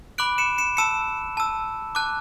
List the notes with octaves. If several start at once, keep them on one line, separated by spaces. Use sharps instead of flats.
B5 D6 F#6 D7 F#7
C#7 E7
C#7 E7
A5 E6 C#7 E7
A5 E6
A5 D6 F#6